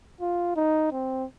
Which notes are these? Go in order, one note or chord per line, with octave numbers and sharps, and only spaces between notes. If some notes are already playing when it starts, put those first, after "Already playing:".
F4
D#4
C4